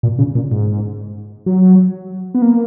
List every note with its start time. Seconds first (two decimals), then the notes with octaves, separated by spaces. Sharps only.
0.03 A#2
0.19 C#3
0.35 A#2
0.52 G#2
1.46 F#3
2.35 B3
2.42 A#3